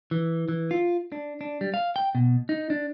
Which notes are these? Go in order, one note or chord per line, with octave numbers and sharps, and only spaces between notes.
E3
E3
F4
D4
D4
G3
F5
G5
B2
D#4
D4